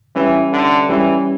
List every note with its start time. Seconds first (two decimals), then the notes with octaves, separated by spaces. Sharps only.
0.16 E3 G3 C#4 G4 B4 E5
0.53 D3
0.89 E3 G3 C#4 G4